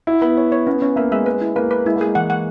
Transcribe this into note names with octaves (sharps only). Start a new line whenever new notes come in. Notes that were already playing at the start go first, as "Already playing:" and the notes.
E4 F#4
B3 B5
C#5
C#5
B3 C#4
C#4
A#3 E5
G#3 E5
B4
E4
A#3 B4
B4
G#3 E4
A#3
G#3 G#4
E3 F#5
F#5